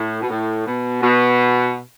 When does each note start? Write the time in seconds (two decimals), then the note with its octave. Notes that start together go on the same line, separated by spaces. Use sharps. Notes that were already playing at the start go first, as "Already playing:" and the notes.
Already playing: A2
0.22 B2
0.30 A2
0.66 B2
1.02 B2